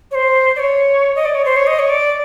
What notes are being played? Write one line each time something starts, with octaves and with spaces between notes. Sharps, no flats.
C#5
C5
D5
C#5
D#5
D5
C#5
C5
C#5
D#5
C#5
D5